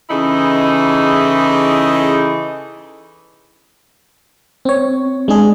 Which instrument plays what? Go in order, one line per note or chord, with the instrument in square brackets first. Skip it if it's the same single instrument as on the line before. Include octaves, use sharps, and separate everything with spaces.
[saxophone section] C#3 E3 D#4 E4 G#4 A4
[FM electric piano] C4 C#5
G#3 D4 G#4